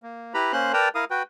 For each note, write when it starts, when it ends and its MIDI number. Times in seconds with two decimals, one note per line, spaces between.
0.03 0.33 58
0.34 0.52 64
0.34 0.52 67
0.34 0.52 71
0.34 0.52 82
0.34 0.52 83
0.53 0.72 58
0.53 0.72 61
0.53 0.72 72
0.53 0.72 84
0.53 0.72 90
0.73 0.89 70
0.73 0.89 71
0.73 0.89 74
0.73 0.89 79
0.73 0.89 81
0.73 0.89 82
0.95 1.05 64
0.95 1.05 70
0.95 1.05 77
0.95 1.05 87
1.10 1.23 66
1.10 1.23 71
1.10 1.23 79